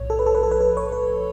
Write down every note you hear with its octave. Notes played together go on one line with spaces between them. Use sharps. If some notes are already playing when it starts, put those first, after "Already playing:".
Already playing: B1 A2 F3 C#5
A4
B4
A4
B4
A4
B4
A4
C#5
B4